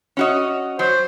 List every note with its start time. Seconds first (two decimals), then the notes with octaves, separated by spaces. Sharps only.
0.17 C#4 F#4 D#5
0.79 F#3 C5